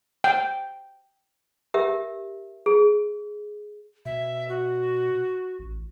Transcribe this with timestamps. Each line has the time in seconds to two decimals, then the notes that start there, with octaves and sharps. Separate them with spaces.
0.24 G5
1.74 G4 A#4 E5
2.66 G#4
4.05 B2 E5
4.49 F#4
5.59 A1